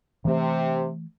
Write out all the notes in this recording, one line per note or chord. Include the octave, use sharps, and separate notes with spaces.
C3 E3 A3